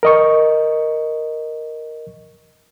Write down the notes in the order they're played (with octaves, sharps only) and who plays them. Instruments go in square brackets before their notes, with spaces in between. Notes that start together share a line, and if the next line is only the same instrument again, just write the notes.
[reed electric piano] A#4 D#5 C#6